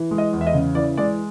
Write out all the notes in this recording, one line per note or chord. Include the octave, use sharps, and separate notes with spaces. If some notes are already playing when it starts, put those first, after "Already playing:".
Already playing: E3
G#3
D#5
E2
E5
D#5
C#3
E3 D5
G#3 D5